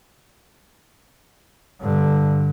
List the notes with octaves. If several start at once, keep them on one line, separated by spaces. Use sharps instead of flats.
G2 D3